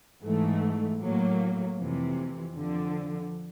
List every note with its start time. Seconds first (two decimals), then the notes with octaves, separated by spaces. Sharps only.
0.23 G#2 E3 A3
1.00 A2 F#3 A#3
1.77 F2 C3 E3
2.55 F2 D3 F3